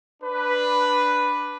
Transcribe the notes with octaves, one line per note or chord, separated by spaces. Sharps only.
D4 B4